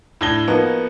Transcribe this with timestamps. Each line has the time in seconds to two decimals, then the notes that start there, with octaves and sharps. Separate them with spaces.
0.21 A2 D4 G#6 A#6 G7
0.47 F3 A#3 B3 D#4 F#4